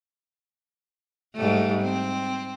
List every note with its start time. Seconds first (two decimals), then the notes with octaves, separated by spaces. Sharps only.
1.36 G#2 G3 A3
1.82 C4